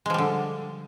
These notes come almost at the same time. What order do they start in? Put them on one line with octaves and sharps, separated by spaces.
G#3 F3 G3 D3